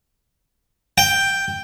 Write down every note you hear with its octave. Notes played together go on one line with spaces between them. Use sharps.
G5